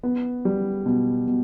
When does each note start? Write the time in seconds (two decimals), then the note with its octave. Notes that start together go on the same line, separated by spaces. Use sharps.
0.03 B3
0.45 G3
0.86 B2
1.27 B2